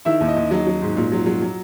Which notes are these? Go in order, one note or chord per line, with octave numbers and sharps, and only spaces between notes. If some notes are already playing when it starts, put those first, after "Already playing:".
D#3 E4 E5
D#2
D#5
D#2
F#3 D#5
F#3
G#2
A#2
F#3
F#3
F#3